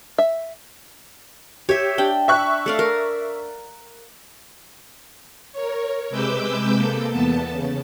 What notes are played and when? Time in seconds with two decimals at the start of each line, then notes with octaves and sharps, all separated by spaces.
0.18 E5
1.69 G4 C#5 E5
1.98 D4 G5
2.28 E5 C#6 F#6
2.66 A3 D5 F5
2.79 A#4
5.52 A#4 C#5
6.10 C3 G#3 B4 D6 E6 G6
6.76 A#3 A4
7.10 E2 B3 A5
7.51 C#3